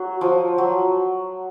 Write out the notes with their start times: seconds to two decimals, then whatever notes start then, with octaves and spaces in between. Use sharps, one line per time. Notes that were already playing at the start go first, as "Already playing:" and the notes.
Already playing: F#3
0.21 F3
0.58 F#3